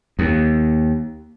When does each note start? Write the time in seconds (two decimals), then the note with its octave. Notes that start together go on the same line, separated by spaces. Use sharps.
0.19 D#2